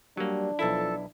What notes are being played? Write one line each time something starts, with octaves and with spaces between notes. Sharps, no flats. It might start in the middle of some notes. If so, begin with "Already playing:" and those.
F#3 G3 A#3 D4
B1 F3 E4 A4